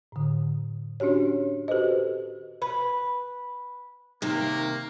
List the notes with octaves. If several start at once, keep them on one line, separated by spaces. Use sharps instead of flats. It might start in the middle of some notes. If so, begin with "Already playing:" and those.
A2 D3
C#4 D4 F#4 G4 C#5
F#4 G4 A4 B4 C5 D#5
B4
C3 D#3 A#3